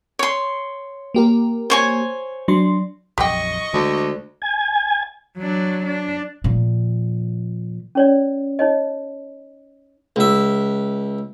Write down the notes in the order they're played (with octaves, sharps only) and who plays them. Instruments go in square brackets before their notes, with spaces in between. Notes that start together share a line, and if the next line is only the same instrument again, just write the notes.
[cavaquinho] C#5 C6
[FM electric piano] A#3 G4 A#4
[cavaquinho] C5 C#5 G#5
[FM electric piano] F#3 D4 C6
[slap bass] A#1 F2 F#3 [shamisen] G4 G5 [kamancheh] D#5 C#6
[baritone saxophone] D2 [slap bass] D3 G#3
[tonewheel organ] G#5
[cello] F#3 D4
D4
[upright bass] A#2 F3
[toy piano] C#4 C#5 D5
D#4 C#5 D#5
[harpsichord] C#2 E5